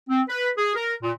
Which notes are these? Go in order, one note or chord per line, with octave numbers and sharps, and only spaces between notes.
C4
B4
G#4
A#4
A#2